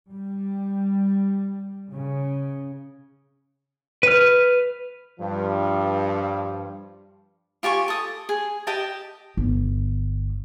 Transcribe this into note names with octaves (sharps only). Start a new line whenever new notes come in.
G3
C#3
B4 F6
G2 F3
F4 G4 G#5 C#6
A4 D#6
G#4
G4 D#5 G5 A5
G1